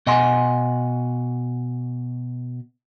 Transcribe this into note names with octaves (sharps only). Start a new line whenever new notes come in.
B2 D#5 F#5 G#5 C6